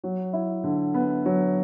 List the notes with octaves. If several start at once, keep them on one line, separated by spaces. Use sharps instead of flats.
F#3
E4
D3
B3
F#3